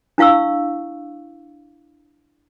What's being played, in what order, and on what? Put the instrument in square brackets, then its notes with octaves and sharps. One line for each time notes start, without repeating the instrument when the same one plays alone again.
[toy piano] D4 E4 F5 C#6 E6